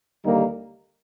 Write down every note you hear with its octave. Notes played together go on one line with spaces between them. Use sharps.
D#2 D3 G3 A#3 D#4